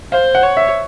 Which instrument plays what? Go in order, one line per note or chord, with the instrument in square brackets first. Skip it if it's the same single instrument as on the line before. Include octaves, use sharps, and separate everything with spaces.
[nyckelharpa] C5 [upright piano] F5
[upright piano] F#5
[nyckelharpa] C#5
[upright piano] E5